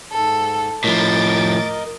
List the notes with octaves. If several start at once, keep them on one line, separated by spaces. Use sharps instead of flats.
G#2 A4
A2 F3 A#4 D#5 D6 A6